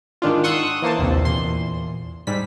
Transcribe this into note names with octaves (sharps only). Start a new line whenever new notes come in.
G#2 D#3 D4 F4
F#5 C6 C#6 D#6 E6 F#6
E3 A#3 C5 A5
A#1 D#2 C3
E2 A#2 C6
G#2 G3 B6